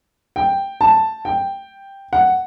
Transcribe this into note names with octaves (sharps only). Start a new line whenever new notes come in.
G5
A5
G5
F#5